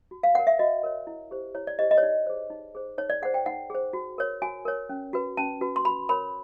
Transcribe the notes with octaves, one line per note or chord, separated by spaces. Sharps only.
F#4
F5
A#4 C#5 F#5
E5
F#4 D#5
A#4 C#5
E4
G4 C5
E4 C#5
D5
G4 C5 D#5
D#5
C#5
D#4 D5
G#4 C5
D#4
G#4 C5
D#4 C#5
D5
G#4 C5 F#5
G5
D#4 F#5
G#4 C5
F#4
A#4 C#5
F#4 G#5
A#4 C#5
C#4
F#4 B4
C#4 A5
F#4 B4
C6
F#4 B5
A#4 C#5 B5